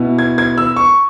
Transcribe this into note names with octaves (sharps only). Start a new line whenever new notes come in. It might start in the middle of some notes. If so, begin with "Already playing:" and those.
Already playing: B2 B3 E4
G#6
G#6
E6
C#6